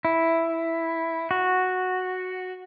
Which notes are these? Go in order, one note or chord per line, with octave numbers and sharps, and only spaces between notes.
E4
F#4